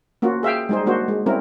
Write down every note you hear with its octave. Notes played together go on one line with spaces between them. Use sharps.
A#3 C#4 F4 F#4
G#4 E5 F5 G5
G3 G#3 D#4 G#4 C5
A#3 D4 F#4 C5
G#3
G3 C4 C#4 E4 A#4